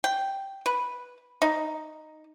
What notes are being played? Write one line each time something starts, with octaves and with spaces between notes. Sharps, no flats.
G5
B4
D#4